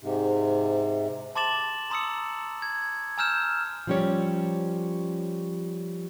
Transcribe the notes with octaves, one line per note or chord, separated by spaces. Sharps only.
G#2 C3
A5 C6 D6 A6 E7 F#7
A#5 C6 D#6 E6 C#7
G#6
G#5 A#5 E6 F6 G6 E7
F3 G3 C#4 G4 C#5 D5